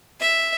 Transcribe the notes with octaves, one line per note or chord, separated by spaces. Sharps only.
E5